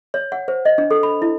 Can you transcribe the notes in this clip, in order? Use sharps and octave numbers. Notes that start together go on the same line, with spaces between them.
C#5
F#5
C5
D#5
D4
A4
B5
E4